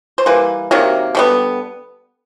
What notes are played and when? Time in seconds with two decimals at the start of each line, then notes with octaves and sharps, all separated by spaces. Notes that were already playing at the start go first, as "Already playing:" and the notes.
0.18 C5
0.26 E3 G3 A#3 B4
0.71 C3 D#3 F#3 A#3
1.15 D3 G3 B3